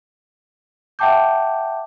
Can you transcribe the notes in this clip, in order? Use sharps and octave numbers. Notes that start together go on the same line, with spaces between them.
E5 F#5 G5 A5 D6 G6